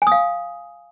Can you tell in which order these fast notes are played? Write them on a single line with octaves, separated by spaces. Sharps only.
G#5 D#6 F5